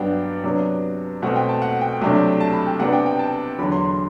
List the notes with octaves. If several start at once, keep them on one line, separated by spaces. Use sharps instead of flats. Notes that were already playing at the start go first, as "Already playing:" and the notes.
Already playing: G2 F#3 B3 D4 F#5 G5
C3 F#3 B3 D4
C2 B2 A3 C4 F#5
G5
A5
F#5
G5
C2 C3 F#3 A3 D4
A5
B5
G5
C3 G3 B3 D4 F#5
G5
G5
A5
E2 D3 F#3 B5
C6
C6